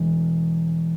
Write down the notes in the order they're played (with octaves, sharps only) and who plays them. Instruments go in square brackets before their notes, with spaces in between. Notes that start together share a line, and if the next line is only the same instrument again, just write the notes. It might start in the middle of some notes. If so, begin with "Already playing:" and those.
Already playing: [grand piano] E1